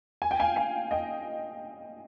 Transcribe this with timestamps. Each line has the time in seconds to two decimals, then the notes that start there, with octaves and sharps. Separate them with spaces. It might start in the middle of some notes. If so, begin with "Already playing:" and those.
0.22 G#5
0.31 G5
0.40 F5 G#5
0.56 F5 G#5
0.91 D#5 G5